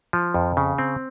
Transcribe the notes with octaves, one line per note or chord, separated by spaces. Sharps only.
F3
F2
C#3
C4